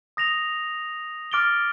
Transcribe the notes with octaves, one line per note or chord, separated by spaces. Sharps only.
D#6 A#6 F7
D6 F6 A6 D7 G7